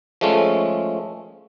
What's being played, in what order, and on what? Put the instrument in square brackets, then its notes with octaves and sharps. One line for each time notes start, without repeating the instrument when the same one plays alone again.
[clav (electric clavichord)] F3 G#3 A3 C#4